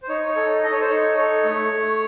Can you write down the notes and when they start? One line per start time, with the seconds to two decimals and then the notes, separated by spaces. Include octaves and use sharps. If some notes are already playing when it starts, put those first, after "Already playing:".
0.03 C5
0.09 D#4 C#5
0.27 C#5
0.36 A4
0.63 A4 D#5
0.71 C#5
0.80 C5
0.88 D#4 C#5
1.17 A4 C#5
1.44 A3
1.71 A3